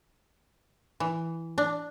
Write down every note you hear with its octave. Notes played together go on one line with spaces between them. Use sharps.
E3
D4